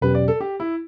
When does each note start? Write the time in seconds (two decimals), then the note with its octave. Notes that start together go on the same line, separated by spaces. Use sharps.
0.02 E2 B2 F#3 C#4 G4 B4
0.15 D5
0.28 A4
0.41 G4
0.60 E4